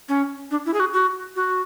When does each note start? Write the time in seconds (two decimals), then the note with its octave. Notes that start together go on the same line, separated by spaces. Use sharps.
0.09 C#4
0.51 D4
0.66 E4
0.74 G#4
0.80 F#4
0.94 F#4
1.36 F#4